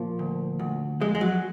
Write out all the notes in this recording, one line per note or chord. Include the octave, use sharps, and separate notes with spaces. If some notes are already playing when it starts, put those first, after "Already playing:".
Already playing: A#2 F3 A#3
D2
D2
F2 G#3
G#3
F#3